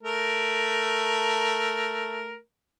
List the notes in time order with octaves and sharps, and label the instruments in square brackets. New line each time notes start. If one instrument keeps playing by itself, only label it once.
[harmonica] A3 A#4